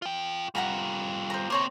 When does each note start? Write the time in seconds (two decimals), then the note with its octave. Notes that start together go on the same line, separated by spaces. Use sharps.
0.02 F4 G5
0.55 G3 F4 F#5 A#5 B5
1.30 C5 A#5
1.50 A#3 C4 C5 C#5 A#5